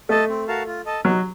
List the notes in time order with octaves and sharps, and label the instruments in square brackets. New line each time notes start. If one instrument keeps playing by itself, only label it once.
[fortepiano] A3 [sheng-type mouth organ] A4 D#5 A5
[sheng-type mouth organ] C4
F#4 A#4 F5 A5
F4
A4 D#5 A5
[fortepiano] F#3 [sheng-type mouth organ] D#4